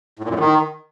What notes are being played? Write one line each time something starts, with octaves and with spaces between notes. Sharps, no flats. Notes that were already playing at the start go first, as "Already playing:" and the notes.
A2
A#2
F#2
A2
D#3